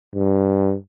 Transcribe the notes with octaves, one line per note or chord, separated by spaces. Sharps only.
G2